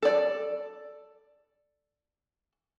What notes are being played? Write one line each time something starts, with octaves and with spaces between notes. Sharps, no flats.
A4 D5